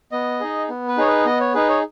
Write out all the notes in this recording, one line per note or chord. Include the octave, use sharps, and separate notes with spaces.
B3 D#5
D#4 G#4
B3
B4
D#4 G#4 C#5
B4
B3 D#5
C#5
D#4 G#4 B4
C#5